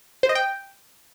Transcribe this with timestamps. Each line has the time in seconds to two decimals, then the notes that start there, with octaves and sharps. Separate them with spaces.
0.23 C5
0.29 D#5
0.35 G5